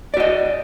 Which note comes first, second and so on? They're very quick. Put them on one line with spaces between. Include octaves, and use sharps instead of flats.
D5 F#4 D#5